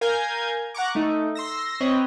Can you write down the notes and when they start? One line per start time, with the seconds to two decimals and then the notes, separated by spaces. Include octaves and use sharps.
0.01 A#4 F5 G#5 A#5 G6 G#6
0.74 F#5 A#5 C#6 D6
0.95 A3 D#4
1.35 C6 E6 A#6
1.80 C4 B4 C#5 D#5